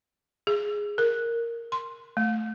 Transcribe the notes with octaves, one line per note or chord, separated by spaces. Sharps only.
G#4
A#4
C6
A3